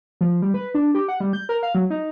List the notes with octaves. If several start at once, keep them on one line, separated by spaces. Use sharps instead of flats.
F3
G3
B4
D4
G4
F#5
G3
G6
A#4
F5
F#3
D#4